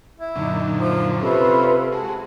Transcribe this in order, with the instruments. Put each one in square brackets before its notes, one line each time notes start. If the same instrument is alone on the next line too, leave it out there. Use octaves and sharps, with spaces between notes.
[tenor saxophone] E4
[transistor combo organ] F#2 A#2 D3 [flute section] D#4
[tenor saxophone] F3
[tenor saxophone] C3 [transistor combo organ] C4 C#4 [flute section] F4 A4 B4
[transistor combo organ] G#3 F#4 [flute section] A5